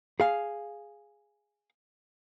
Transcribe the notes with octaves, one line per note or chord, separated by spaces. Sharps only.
G#4 F5